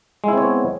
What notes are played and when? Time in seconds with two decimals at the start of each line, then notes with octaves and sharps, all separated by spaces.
0.24 G#3
0.28 E4
0.33 C4
0.38 C#5
0.42 B3